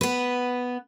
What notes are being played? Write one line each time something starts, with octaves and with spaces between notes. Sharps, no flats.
B3 B4